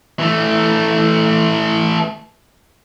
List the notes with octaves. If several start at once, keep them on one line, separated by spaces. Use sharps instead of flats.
E3 A3